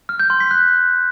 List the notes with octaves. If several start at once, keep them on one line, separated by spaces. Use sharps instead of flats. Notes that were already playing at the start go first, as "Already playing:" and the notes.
F6
G6
C6
B6
F#6